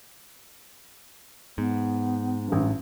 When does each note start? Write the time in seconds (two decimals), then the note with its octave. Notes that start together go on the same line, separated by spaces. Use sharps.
1.58 G#2 B3
2.48 A1 G2